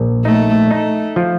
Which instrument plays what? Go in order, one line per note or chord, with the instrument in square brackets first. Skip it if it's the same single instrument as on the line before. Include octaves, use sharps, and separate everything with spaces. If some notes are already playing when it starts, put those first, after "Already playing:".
Already playing: [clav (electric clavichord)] A#1
[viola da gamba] A3 [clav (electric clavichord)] D#4
[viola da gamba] A3 [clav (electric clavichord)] D#4
[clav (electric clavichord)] F3